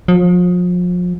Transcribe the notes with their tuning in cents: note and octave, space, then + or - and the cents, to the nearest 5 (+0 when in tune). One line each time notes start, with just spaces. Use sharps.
F3 +35